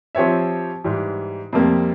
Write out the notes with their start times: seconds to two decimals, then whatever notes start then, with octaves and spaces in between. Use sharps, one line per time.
0.15 F3 C4 G4 C#5 E5
0.84 G#2 E3 G3
1.53 F2 C3 G3 A#3